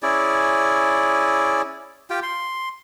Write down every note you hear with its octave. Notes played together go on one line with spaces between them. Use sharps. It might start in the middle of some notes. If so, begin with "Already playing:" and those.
C#4 E4 G#4 D5
F4 G4 G5
C6